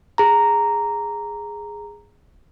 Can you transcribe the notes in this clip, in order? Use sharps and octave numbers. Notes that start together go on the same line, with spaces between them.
G#4 A#5